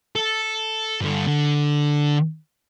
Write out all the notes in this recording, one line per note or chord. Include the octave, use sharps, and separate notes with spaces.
A4
G2 D3
D3